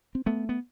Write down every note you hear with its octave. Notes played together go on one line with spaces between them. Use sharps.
C4
A3 B3
B3